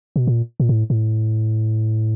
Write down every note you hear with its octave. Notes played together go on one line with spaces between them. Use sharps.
B2
A#2
A#2
A2
A2